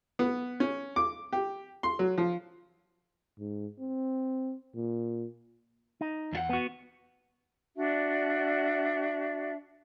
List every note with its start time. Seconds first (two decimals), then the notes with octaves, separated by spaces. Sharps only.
0.19 B3
0.60 C#4
0.96 D6
1.32 G4
1.83 C6
1.99 F#3
2.18 F3
3.39 G#2
3.79 C4
4.75 A#2
6.01 D#4
6.33 E2 F4 F#5
6.49 B3 F#4
7.76 D4 F#4 D5 E5